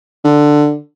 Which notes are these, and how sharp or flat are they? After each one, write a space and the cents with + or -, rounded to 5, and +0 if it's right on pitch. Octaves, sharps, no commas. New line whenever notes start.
D3 +10